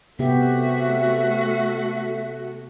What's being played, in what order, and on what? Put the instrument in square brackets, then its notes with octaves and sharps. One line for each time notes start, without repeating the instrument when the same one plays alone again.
[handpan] C3 B3 G4 [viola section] A3 F#4 [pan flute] E5